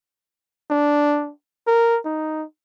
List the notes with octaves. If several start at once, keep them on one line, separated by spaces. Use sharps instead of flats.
D4
A#4
D#4